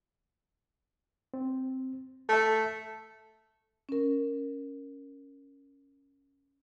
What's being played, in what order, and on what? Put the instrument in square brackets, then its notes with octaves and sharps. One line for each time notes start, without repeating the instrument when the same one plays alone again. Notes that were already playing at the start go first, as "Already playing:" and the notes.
[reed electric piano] C4
[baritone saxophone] A3 [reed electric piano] A4 E5
[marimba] C#4 A#4